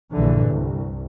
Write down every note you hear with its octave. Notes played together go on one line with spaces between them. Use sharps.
A#1 G2 D3 E3
C2